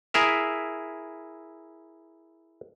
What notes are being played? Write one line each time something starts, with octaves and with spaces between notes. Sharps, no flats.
E4 G#4 A#4 E5